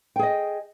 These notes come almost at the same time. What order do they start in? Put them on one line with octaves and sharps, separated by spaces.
G5 G#4 D#5